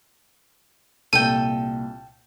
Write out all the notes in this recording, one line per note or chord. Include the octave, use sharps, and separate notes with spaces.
C2 A#2 A4 G5 D#7